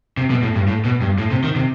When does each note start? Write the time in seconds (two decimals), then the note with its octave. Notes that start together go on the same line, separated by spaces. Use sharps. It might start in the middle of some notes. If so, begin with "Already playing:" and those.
0.17 C3
0.30 B2
0.43 A2
0.55 G2
0.68 A2
0.85 B2
1.01 G2
1.18 A2
1.31 C3
1.44 D#3
1.56 C3